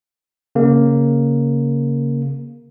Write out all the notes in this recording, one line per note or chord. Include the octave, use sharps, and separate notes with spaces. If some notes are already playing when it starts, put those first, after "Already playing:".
C#3 A#3